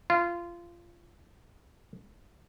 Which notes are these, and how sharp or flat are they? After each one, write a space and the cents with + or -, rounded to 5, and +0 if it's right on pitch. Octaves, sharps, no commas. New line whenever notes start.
F4 -20